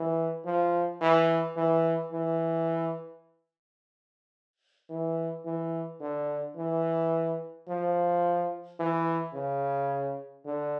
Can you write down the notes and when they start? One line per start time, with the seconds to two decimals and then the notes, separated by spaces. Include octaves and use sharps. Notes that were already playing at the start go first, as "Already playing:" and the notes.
Already playing: E3
0.45 F3
1.01 E3
1.56 E3
2.12 E3
4.90 E3
5.45 E3
6.00 D3
6.56 E3
7.68 F3
8.80 E3
9.34 C#3
10.45 D3